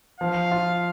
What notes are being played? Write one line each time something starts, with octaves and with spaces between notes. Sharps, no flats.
F3 F5
F4